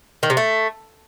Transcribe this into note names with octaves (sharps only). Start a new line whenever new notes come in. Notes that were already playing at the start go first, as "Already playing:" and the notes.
D#3
C3
A3